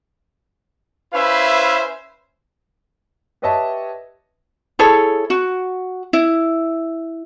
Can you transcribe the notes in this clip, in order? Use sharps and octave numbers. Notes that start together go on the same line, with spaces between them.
C#4 E4 B4 C5 E5 F5
G4 B4 C#5 D#5 E5 A5
E4 G#4 A4 C#5
F#4
E4